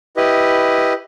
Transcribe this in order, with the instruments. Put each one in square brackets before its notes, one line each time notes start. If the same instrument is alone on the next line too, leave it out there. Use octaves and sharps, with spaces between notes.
[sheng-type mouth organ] E4 G4 B4 D#5